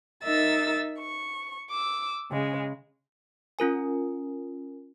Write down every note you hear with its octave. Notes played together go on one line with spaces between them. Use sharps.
D#4 A#4 E5 E6 A6
C#6
D6 E6
C#3 G#3
C#4 F4 A#4 G#5